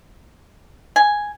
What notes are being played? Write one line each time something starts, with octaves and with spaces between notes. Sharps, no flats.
G#5